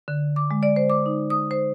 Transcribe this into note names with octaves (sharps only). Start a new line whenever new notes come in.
D3
D6
G#3
D5
C5
D6
D#4
D#6
C5